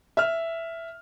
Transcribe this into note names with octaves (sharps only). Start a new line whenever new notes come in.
E5 F6